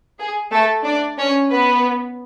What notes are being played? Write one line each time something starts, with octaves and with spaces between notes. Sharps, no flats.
G#4
A3 A4
D4 D5
C#4 C#5
B3 B4